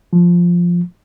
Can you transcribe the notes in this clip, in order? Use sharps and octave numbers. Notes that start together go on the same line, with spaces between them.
F3